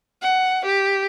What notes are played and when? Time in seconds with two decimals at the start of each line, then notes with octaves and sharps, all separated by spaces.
0.22 F#5
0.65 G4